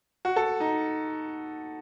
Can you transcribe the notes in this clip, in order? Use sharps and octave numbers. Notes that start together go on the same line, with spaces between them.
F#4
A4
D#4